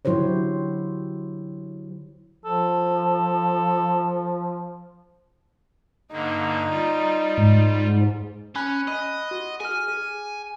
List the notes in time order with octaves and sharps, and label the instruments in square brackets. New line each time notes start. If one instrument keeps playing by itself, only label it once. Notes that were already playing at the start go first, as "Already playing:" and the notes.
[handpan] D3 F#3 E4 G4 C5 C#5
[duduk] F3 [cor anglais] A4
[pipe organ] G2 D3 A#3 [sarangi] D#4
[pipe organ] G3 F4
[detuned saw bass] G#2
[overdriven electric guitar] C#4 [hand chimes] G#5 B5 F#6
[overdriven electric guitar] D#5 [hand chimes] B5 F#6
[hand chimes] F#4
[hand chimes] G#4 F6 [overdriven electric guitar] G#5
[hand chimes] G#4